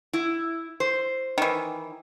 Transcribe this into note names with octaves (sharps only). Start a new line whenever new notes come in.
E4
C5
D#3 E3